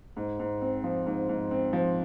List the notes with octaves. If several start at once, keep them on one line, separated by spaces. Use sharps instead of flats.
G#2
G#2
C4
F3
G#2
G#2
C4
F3